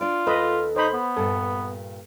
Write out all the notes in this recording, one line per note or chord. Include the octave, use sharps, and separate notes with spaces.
D4 F4 D5
D#2 A4 B4 D#5
D#4 C5 B5
B3
G2 A#2 A4